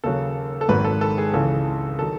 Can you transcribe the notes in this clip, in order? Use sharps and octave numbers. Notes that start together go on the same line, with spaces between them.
D#2 C#3 F#3 A4
A4
G#1 G#2 D#3 F#3 B4
A4
A4
G#4
C#2 C#3 E3 A4
D#3 F#3 A4